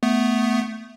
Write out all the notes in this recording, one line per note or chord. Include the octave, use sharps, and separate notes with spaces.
A3 B3